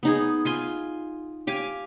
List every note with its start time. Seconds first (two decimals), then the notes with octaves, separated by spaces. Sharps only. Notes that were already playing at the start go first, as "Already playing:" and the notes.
0.03 B3 D#4 G#4
0.45 F4 G#5 C6
1.47 G4 F5 G#5